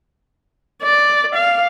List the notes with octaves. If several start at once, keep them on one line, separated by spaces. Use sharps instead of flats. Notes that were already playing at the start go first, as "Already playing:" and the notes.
D5
F5